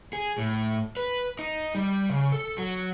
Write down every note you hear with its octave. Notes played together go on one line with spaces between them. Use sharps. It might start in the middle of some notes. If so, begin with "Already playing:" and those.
G#4
A2
B4
D#4
G3
C#3
A4
F#3